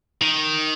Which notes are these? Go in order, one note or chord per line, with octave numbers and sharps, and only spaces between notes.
D#3